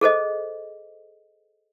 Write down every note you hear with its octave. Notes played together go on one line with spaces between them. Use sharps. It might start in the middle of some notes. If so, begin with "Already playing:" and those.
G#4 A4 C5 D#5